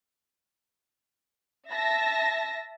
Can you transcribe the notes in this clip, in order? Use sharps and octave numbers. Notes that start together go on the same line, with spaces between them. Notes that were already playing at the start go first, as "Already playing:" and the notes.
E5 A5 A#6